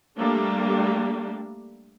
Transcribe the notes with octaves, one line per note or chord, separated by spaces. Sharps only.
G3 A3 A#3 D4